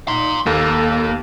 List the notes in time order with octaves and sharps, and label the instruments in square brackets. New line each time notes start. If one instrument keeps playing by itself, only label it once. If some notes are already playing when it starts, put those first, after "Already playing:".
[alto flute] D#4 [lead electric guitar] A#5 C6
[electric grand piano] D#2 [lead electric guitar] A#3 [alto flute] A4